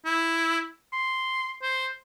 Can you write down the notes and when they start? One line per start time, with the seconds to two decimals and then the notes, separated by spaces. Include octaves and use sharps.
0.05 E4
0.93 C6
1.62 C5